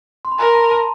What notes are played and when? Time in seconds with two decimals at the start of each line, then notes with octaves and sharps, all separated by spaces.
0.25 C6
0.32 B5
0.38 A#4 A#5
0.55 A5
0.71 A5